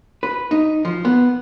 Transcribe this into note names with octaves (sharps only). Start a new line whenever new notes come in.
B4
D#4
F3
B3